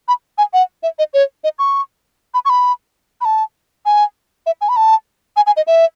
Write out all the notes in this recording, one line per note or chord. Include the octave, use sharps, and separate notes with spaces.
B5
G#5
F#5
E5
D#5
C#5
D#5
C#6
B5
C#6
B5
B5
A5
G#5
E5
G#5
B5
A5
G#5
G#5
D#5
E5